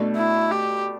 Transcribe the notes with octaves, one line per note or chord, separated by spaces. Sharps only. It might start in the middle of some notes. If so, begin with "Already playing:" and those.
Already playing: B2 A3 D4
E4
G4